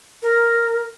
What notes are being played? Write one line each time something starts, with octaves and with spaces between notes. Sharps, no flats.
A#4